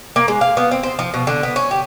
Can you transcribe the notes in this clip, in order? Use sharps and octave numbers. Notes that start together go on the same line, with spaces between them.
A#3
G#3
F5
B3
C4
C5
F3
B2
D3
B3
C#4
G4